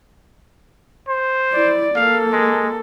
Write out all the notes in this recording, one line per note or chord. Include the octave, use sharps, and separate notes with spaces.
C5
E4 D5
A#3 A4 F5
G#3